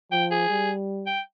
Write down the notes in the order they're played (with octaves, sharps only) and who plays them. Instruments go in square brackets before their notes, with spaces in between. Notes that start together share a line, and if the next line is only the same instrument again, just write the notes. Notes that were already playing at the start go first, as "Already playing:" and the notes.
[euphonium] F3 [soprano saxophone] G5
[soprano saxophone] G#4
[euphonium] G3
[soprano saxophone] G5